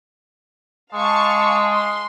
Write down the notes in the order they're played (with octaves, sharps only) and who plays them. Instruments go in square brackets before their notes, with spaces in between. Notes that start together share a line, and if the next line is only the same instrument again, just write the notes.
[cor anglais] G#3 [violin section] F5 A5 C#6
[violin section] C6